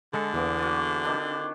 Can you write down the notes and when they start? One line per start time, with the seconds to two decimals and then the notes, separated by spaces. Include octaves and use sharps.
0.13 D3 G#3 A4
0.34 E2 E3 A#3 B3
0.58 F4 F#4
1.04 D#3 C4 D4